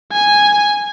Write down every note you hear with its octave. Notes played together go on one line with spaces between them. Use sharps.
G#5